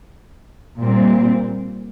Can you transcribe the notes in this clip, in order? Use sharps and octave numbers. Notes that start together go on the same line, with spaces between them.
A#2 G3 C4